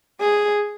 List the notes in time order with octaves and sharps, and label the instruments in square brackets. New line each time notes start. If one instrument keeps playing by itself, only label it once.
[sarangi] G#4